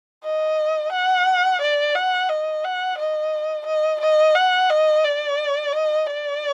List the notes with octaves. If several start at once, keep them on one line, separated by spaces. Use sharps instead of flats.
D#5
F#5
D5
F#5
D#5
F#5
D#5
D#5
D#5
F#5
D#5
D5
D#5
D5